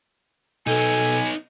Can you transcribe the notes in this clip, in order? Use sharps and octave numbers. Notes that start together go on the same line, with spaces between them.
B2 B3 D#4 A4 G#5